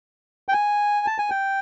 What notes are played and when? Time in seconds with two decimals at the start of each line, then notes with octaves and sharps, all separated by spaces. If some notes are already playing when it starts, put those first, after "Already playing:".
0.49 G5
0.53 G#5
1.06 A5
1.18 G#5
1.30 G5